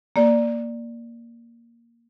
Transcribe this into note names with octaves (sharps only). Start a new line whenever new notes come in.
A#3 D5